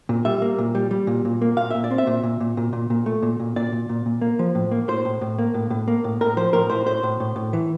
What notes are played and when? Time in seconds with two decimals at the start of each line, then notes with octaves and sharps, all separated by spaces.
0.09 A#2
0.25 G3 E5
0.42 A#3
0.58 A#2
0.75 G3
0.91 G3
1.07 A#2
1.25 A#2
1.41 A#3
1.57 A#2 F5
1.71 A#2 E5
1.84 D5
1.91 C4
1.98 E5
2.07 A#2
2.23 A#2
2.40 A#2
2.57 A#2
2.73 A#2
2.90 A#2
3.06 A3
3.22 A#2
3.40 A#2
3.56 A#2 D5
3.72 A#2
3.89 A#2
4.06 A#2
4.21 A#3
4.39 F3
4.55 A2
4.71 A#3
4.88 A2 C5
5.05 A2
5.21 A2
5.38 A#3
5.54 A2
5.70 A2
5.88 A#3
6.04 A2
6.21 A2 A#4
6.37 F3 C5
6.53 A2 A#4
6.70 A2 C5
6.86 A2 C5
7.03 A2
7.20 A2
7.36 A2
7.53 E3